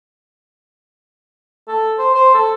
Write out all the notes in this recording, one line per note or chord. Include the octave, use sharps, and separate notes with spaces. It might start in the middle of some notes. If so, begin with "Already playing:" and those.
A4
C5
C5
A4